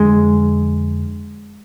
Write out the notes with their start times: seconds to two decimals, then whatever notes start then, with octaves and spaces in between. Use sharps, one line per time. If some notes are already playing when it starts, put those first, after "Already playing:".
Already playing: F2 D3 G#3